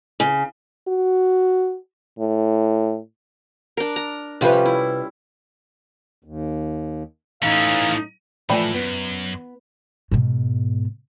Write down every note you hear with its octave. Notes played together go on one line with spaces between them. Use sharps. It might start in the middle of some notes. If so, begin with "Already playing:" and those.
C#3
F#4
A2
D4 A#4
A#5
C3 F3 G3 C#4 B4
E4
D#2
A2 E3 C#4 D#4 F5
A2 E3 F3 A3 D5 G5 B5
F#2 B3
G#2 B2